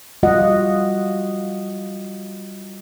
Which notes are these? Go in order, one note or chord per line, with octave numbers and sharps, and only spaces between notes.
G3 F4 F#4 D#5 F#5